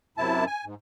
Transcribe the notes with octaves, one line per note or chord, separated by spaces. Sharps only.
F#2 C3 E4 A5
G#5
G#2